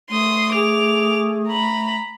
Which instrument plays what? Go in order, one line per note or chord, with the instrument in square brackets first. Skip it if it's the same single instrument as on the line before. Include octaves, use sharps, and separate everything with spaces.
[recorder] A3 [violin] C6 D#6
[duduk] G#4 [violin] D6 F7
[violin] A#5 B5